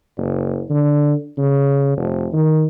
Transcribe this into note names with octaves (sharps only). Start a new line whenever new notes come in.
F#1
D3
C#3
F1
D#3